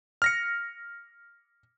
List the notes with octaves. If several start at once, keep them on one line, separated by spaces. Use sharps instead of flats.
F6 A#6 C#7